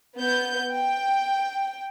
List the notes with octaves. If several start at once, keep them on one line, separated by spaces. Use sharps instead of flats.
B3 G6
G5